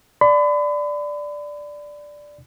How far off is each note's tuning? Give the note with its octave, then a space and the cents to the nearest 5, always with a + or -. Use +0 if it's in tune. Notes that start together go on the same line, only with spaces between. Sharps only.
D5 +0 B5 +35